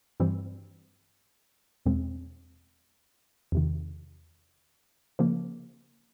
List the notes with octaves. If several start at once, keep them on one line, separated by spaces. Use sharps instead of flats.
G2 E3 G3 C4
E2 B2 G#3 C4
E2 C3 D#3
C#3 F3 A#3